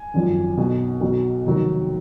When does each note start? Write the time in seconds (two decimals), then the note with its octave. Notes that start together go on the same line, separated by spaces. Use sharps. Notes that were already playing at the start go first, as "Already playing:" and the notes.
Already playing: G#5
0.14 G#1 F#2 F3
0.57 B1 B2 F#3
1.01 B1 B2 F#3
1.45 F1 D#2 D#3 F#3